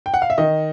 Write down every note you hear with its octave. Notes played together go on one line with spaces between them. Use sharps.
G5
F#5
F5
E5
D#3 D#5